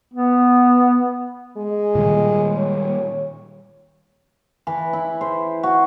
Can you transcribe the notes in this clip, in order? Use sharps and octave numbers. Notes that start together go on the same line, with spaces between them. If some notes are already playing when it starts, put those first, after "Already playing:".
B3
G#3
A#2 D#3 G3
C#5
E3
E4
C5
F#4